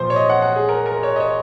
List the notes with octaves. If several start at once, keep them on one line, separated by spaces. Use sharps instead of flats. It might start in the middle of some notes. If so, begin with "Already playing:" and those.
Already playing: A#2 F3 C5
C#5
D#5
F#5
F#5
G#4
A#4
A#4
C#5
D#5
C#5